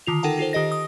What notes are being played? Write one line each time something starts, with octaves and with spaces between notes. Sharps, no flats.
D3 D#3 F4 F7
D#4 A4 A#4 F#5 G5 A5
D#4 F4 A4 C5
D#3 G4 D#5 A#6
D#6